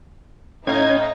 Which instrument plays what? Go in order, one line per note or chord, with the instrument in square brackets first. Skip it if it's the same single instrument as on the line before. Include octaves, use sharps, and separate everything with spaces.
[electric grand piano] A2 F5 [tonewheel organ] C#4 G#6 [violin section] D#4